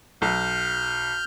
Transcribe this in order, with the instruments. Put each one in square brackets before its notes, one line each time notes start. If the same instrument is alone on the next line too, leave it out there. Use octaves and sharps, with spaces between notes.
[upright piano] B1 [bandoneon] F6 G6